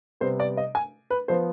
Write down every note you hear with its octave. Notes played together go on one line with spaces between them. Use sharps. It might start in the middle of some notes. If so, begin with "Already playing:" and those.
C3 G3 B3 C5
D5
D#5
G#5
B4
F3 B3 C5